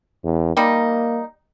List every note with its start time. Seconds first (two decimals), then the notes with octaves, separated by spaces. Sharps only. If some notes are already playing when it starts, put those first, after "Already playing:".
0.24 E2
0.57 G3 A#3 D#4